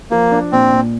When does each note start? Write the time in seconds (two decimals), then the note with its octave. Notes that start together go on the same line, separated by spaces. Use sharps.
0.11 F3 A#3
0.32 D4
0.52 A#2 C4
0.72 A#2